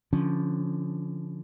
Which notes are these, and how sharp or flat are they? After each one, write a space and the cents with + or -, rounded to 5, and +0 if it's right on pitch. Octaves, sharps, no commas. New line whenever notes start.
D3 -15 F3 +0 C#4 +0